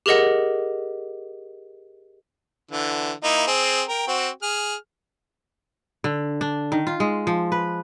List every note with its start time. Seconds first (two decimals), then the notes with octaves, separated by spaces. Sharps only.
0.06 G4 G#4 A#4 D#5 F#5
2.71 D3 E3
3.24 A#3 D#4 E4
3.47 C4 G#4
3.89 A#4 G5
4.08 C4 F#4
4.42 G#4 F6
6.04 D3
6.41 D4
6.72 D#3
6.87 F4
7.00 G#3
7.27 F3
7.52 B4